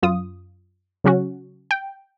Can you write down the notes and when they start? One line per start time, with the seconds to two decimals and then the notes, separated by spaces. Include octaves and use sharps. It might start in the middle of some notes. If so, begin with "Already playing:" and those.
0.02 F#2 F4 D#6
1.04 C#3 F#3 C#4 F#4
1.71 G5